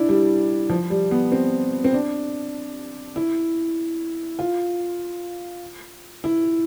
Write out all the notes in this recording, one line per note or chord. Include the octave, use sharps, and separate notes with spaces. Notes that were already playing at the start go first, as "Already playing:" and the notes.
Already playing: D4 E4
G3
F3
G3
B3
C4
C4
D4
E4
F4
E4